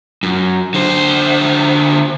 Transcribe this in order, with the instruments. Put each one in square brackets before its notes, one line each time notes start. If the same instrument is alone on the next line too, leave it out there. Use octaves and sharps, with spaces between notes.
[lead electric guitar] F#2
D3 C5